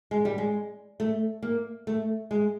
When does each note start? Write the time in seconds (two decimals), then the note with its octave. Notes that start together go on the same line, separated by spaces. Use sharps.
0.11 G#3
0.25 G3
0.38 G#3
1.00 A3
1.43 A#3
1.87 A3
2.31 G#3